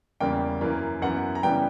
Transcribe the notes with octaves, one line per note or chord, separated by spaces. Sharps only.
E2 C#3 G3 A#3 G5
F#2 E3 A#3
F#2 E3 B3 F#5
A#5
C#3 E3 G3 B3 G5